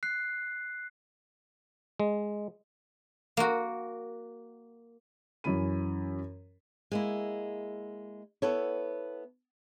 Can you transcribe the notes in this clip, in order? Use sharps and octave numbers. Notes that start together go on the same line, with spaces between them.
F#6 C7
G#3
A#3 F#4
F#2 E3 C#4 B5 D#7
G#3 A#3 E4
B3 E4 A4 C#5